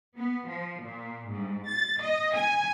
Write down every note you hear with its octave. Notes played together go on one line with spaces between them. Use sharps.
B3
F3
A#2
G#2
A6
D#5
G#5